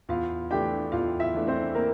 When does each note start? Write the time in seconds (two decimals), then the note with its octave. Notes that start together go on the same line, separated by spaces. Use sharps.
0.09 E2 F4 F5
0.51 E3 A3 D4 G4 G5
0.92 E2 F4 F5
1.20 E4 E5
1.34 E3 A3 D4
1.47 C4 C5
1.75 A#3 A#4